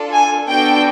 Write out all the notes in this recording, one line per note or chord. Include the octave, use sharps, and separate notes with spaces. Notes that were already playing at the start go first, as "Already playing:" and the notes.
Already playing: D4 F4 A4
G#5
B3 D4 F#4 A4 G5